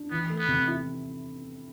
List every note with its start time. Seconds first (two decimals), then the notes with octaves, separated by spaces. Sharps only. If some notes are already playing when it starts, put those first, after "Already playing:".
Already playing: D4
0.11 E3 B3
0.30 A3
0.39 B3
0.48 C3
0.68 E4